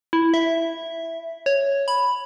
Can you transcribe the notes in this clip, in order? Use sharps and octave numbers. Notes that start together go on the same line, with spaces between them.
E4
E5
C#5
B5